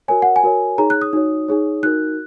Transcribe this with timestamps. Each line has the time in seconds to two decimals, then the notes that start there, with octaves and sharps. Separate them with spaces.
0.08 F#4 A#4 C#5 G#5
0.22 F#5
0.36 G#5
0.43 F#4 A#4 C#5
0.78 D#4 G#4 C#5 A#5
0.90 F#6
1.02 D#6
1.13 D#4 F#4 C#5
1.48 D#4 G#4 C#5
1.83 D#4 F#4 A#4 F#6